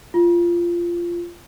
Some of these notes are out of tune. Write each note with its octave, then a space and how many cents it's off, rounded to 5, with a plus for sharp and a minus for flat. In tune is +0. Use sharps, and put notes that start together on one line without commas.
F4 -15